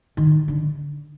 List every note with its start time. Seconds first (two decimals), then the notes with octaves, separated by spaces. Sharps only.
0.17 D#3
0.48 D3